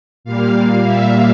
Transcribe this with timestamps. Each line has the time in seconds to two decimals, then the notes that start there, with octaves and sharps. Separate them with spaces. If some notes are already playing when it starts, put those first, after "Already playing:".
0.24 A#2 G3 A#3 F5
0.85 E5